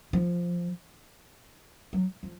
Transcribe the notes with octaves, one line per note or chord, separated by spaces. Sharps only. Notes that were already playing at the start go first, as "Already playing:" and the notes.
F3
F#3
F3